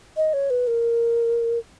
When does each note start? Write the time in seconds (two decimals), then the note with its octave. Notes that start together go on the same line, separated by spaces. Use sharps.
0.17 D#5
0.33 C#5
0.50 B4
0.67 A#4